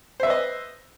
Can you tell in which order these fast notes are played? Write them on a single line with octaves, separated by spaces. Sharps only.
C5 E5 B4 D#5